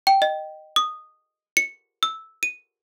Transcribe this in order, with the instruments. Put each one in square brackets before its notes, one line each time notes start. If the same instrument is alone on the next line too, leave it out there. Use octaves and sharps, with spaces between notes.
[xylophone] G5
D#5
D#6
C#7
E6
D#7